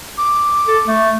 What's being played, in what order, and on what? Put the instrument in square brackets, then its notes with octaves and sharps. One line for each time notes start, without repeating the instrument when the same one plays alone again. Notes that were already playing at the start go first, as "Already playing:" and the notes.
[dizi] D6
[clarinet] A4
A3